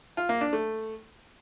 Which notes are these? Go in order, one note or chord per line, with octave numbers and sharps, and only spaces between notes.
F4
A#3
D4
A3